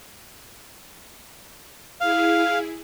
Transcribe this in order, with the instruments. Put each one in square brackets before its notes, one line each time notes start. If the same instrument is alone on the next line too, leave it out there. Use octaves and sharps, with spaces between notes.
[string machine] E4 G#4 [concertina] F5